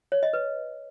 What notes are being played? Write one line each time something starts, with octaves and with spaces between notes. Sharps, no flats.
C#5
D#5
B4